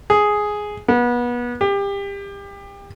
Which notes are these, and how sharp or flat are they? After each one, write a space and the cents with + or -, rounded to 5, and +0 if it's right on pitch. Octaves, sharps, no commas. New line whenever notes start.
G#4 +5
B3 -30
G4 +30